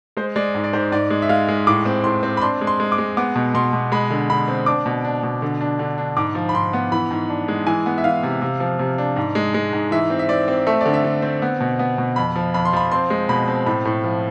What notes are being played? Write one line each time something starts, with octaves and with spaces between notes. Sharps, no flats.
G#3 C5
G#3 D5
G#2
D5
G#2 C5
G#2 D5
G#3
E5
G#3 F5
G#3
A2 D6
C4
A2 C6
C4
B5
D4 C6
G#3
C6
G#3
D6
G#3
B3 D6
B2
B2 C6
B2
G#3 B5
D3
D3 B5
C4
D4 D6
B2
D4
B2
D3
D4
D3
D4
G#2 D6
F3
B5
G#2 C6
B3
E3 B5
G#2
D4
G#3
E3 G#5
B3
E5
E3 F5
C3
C3
F3
C3
D4
G#2
G#3
G#3
G#2
E3 E5
C4
E5
C4 D5
C4
A3 E5
D3 D5
E5
D3
C4
B3
B2
B3
B2
F2 B5
F3
F2 B5
C6
F3 B5
C4 C6
G#3
B2 B5
C4
A2 B5
A2
F3